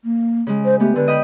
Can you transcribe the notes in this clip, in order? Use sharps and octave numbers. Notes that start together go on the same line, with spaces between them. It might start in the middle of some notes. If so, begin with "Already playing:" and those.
A#3
C#3 G#3
C5
A3 B3 G4
D3 B4
D#5 G5 B5